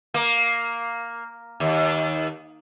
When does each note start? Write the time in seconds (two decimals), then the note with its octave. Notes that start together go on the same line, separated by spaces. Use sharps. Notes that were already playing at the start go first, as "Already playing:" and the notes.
0.14 A#3
1.60 D#2